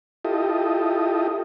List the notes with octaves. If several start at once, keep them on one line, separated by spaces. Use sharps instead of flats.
E4 F4 G4 A4 D#5